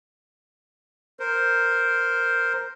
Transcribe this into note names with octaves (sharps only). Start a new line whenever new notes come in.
A#4 C5